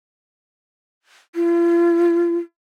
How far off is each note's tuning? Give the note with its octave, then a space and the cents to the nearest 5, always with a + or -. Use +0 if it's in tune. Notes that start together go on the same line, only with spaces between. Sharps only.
F4 -40